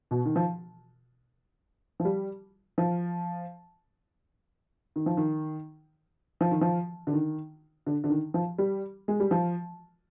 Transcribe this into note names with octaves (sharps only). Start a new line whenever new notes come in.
B2
D#3
F3
F3
G3
F3
D#3
F3
D#3
F3
D#3
F3
D3
D#3
D3
D3
D#3
F3
G3
G#3
G3
F3